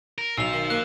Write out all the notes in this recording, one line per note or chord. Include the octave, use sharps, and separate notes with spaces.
A#4
B1 F4 C5 E6 F7
D#3
A#3 F#6